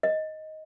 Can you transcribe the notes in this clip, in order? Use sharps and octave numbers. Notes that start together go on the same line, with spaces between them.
D#5